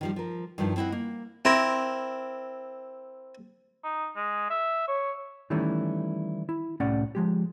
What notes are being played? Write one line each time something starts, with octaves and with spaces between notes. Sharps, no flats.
D#3 F3 G3
F3 A#4
G2 D#3 F3 E4
C4 E4 D#5 F#5
A#3
C4 E4 A#4
D#4
G#3
E5
C#5
D#3 E3 G3 A3 C#4 E4
E4
C2 A2 C#4 D5 F#5
F3 G#3 G4